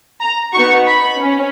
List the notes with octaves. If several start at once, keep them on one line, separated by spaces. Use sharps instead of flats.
A#5
B3 D#4 F#4 C#6
B5
C#4